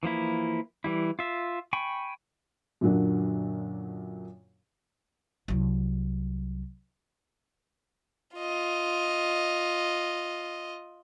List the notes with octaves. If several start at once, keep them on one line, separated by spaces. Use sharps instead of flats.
E3 F3 A#3 E4
E3 G3 E4
F4 E5
G5 G#5 B5 C#6
F#2 A#2 D3 F#3 A#3 D4
C2 F#3
F4 D#5